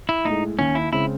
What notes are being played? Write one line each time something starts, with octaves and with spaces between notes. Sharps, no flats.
E4
A2 G#3 D#4
D#2 C#4
E4
C#3 G#3 C4 E4